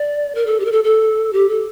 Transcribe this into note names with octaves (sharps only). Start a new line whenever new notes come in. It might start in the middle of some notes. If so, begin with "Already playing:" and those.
Already playing: D5
A#4
A4
G4
A#4
A4
A4
G4
A4